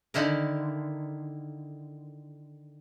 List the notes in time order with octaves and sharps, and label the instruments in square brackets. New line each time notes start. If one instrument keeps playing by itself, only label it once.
[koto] D3 D#3 E4 A#4